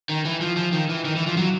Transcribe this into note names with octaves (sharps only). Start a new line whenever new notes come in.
D#3
E3
F3
F3
D#3
E3
D#3
E3
F3
F#3